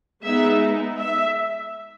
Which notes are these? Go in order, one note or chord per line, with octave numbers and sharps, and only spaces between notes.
G#3 B3 D#4 E5
E5